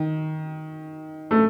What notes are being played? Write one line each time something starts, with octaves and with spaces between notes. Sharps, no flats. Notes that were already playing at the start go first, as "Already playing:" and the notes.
Already playing: D#3
A3